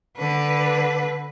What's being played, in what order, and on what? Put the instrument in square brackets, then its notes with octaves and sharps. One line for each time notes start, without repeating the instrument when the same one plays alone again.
[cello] D3 B4